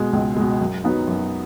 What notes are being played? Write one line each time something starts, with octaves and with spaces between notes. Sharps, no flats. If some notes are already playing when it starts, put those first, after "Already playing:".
Already playing: B2 G#3
C#2
B2 G#3
F#2
F#3 B3 D#4
F#2